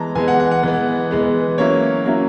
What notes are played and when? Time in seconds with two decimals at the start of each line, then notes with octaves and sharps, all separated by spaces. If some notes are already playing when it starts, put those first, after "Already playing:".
Already playing: E3 G#3 B3 A5 A#5
0.15 E3 G#3 B3 G#5
0.28 F#5
0.40 F#5
0.51 F#5
0.63 E3 G#3 B3
1.11 E3 G#3 B3
1.58 F#3 A#3 C#4 E4 C#5
2.06 F#3 A#3 C#4 E4